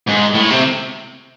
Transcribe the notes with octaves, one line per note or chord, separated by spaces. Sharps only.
G#2
A2
C3